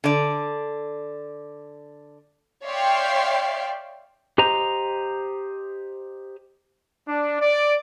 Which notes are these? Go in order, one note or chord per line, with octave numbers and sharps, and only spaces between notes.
D3 D5
C#5 D5 E5 F5 G5 C6
G4 C5 D#5 A#5
D4
D5